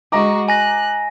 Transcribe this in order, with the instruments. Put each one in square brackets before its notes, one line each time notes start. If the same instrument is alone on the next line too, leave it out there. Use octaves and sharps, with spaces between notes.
[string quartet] G#3 F#4 C#6 [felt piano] D#5 A#5 D6
[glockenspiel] G#5 A#6 [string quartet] F#6